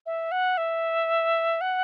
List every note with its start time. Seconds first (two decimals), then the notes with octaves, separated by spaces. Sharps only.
0.06 E5
0.32 F#5
0.57 E5
1.61 F#5